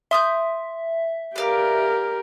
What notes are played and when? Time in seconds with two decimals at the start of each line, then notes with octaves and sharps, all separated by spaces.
0.11 E5 C6 D#6 G6
1.36 G4 A#4 B4 D5 F5